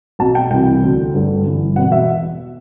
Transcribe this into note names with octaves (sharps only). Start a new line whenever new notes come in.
B1 B2 A5
G5
C2 C3 E3 G5
D2 D3
G1 G2 D3
G1 G2 E3
E1 E2 B2 F#5
E5